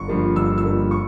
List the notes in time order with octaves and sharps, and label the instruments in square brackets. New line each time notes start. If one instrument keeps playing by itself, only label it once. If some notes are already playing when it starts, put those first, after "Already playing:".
Already playing: [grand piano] G1 C#6
G2 F3 A#3
G1 E6
E6
G2 F3 A#3
C#6